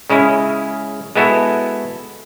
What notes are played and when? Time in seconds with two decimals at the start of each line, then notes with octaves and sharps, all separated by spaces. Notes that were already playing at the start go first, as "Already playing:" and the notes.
0.10 C#3 G#3 C#4 E4
1.15 G#3 B3 E4 F#4 A4